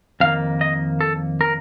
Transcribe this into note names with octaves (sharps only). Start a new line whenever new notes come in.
F2 D#3 A#3 F5
D#5
A4
A#4